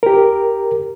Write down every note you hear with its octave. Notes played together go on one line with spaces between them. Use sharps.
G4 A#4